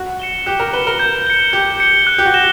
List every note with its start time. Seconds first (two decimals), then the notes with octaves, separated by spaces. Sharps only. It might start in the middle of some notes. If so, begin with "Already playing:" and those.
Already playing: F#4
0.19 C#7 E7 G7
0.46 G4 F#6
0.60 A#4
0.73 B4 C#7 E7 G7
0.87 A#4
0.99 G6
1.27 C#7 G7
1.53 G4 G6
1.80 C#7 G7
2.07 F#6
2.18 G4
2.26 F#4
2.34 A#6 E7 G7